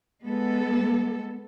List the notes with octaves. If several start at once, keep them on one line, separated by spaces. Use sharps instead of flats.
G#3 B3 A4